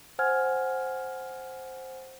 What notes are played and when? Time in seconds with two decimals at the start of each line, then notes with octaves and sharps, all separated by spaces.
0.19 C5 F#5 G#5 F6 G#6